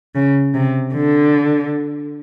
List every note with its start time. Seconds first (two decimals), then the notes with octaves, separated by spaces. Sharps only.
0.15 C#3
0.55 C3
0.94 D3